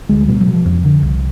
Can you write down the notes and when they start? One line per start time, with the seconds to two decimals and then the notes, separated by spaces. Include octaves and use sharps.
0.09 D2 G#3
0.28 B2 G3
0.40 F#3
0.47 B2
0.53 F3
0.66 F2
0.85 D3
1.03 C2